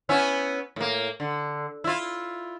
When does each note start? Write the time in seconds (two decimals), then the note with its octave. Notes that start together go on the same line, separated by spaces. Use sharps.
0.09 B3 C#4 E4
0.76 A2 A#3
1.20 D3
1.84 E4 F4